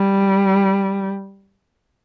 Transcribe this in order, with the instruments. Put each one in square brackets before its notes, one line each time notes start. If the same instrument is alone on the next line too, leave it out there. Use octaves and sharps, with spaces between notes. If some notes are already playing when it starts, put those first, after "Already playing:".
Already playing: [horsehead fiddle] G3